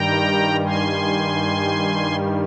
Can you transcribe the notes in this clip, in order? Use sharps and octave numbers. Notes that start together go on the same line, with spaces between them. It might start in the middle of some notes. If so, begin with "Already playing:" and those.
Already playing: G2 D#3 G3 G5 A#5
G#5 C6